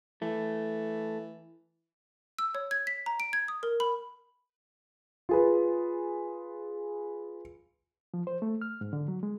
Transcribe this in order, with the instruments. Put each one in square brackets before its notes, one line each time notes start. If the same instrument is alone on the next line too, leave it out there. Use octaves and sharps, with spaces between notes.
[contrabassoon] E3 [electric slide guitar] A3
[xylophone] E6
C#5
G#6
B6
A#5
D7
G#6
D#6
A#4
B5
[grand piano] F4 G#4 B4
[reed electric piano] F3
C5
A3
F6
G#2
D3
F#3
G#3